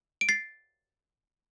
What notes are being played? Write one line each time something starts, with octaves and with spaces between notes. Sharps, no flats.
D7
A6 C7